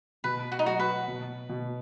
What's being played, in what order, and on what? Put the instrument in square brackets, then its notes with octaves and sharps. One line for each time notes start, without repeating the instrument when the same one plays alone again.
[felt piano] B2 [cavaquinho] B4
[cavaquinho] F#4
D#4
[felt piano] F#3 [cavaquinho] F#4
[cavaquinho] B4
[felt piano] B2
B2